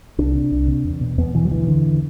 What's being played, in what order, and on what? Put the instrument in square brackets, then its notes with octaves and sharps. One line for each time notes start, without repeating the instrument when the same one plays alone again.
[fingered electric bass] C2 D4
C3
C2
C3
E2
B2
E2 B3
B2 E3
F#3
D2 E3
D3